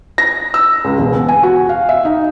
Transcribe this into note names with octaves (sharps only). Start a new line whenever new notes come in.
A#6
E6
C#2
E1
B3
G#5
F#4
F5
E5
D#4